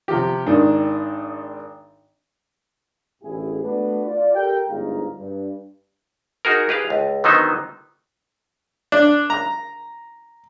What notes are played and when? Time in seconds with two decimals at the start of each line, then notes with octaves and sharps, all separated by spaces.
0.08 C3 F3 G4
0.46 G#1 D#3 D4
3.22 A1 D2 A2 E4 G4 G#4
3.63 A3 B3 D4 F#4 B4
4.05 F4 D5
4.34 G4 A4 A#4 G5
4.68 G1 D2 G#2 F5 A#5
5.17 G2
6.45 D#4 F#4 G#4 A#4
6.69 G4 G#4 B4 F5
6.90 C#2
7.24 D3 D#3 F#3 B3 D#4 C5
8.92 D4
9.30 A#5